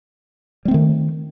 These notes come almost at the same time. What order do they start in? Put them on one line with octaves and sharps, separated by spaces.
G3 C4 A3 D#3